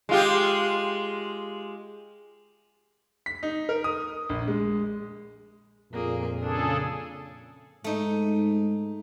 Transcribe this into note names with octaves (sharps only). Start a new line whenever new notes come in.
G#3 F4 G4
B6
D#4
A#4
D#6
A#1
G#3
F2 A#2 A#3 G#4
C#3 D4 G#4 A4
G#2 A3 D#4